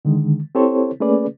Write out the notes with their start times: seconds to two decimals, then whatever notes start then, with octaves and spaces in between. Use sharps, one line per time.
0.05 D3 D#3 G#3
0.55 C4 E4 G4 A4 C5 C#5
1.00 A3 A#3 C#4 G#4 B4 D5